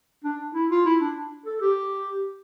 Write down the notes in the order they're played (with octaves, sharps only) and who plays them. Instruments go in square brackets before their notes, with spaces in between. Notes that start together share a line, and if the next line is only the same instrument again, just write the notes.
[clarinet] D4
E4
F4
E4
D4
A4
G4